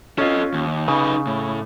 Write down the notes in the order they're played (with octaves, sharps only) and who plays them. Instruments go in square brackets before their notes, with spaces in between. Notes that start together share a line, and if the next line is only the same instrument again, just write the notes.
[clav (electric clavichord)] C#4 F4 [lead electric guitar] A4 D#5
[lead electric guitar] D#2
[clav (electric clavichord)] C#3 [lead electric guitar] D#4 B4
[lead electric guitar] A2